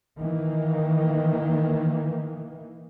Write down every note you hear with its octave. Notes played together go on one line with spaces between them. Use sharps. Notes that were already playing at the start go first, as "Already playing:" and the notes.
D#3 E3 A#3